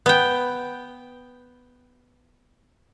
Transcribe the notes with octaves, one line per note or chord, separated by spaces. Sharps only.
B3 G5